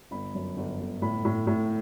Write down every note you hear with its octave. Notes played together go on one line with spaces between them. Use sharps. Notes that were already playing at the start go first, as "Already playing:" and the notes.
G1 B5
F#2
G1
G1
A2 B5
A2
A2